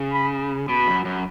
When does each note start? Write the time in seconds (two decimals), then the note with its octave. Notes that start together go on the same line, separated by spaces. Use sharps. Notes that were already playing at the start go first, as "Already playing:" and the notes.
Already playing: C#3
0.13 B5
0.69 B2 B5
0.87 F#2
1.05 F#2